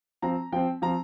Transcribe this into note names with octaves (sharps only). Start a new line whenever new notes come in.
F3 C4 A#5
F3 C4 G5
F3 C4 A#5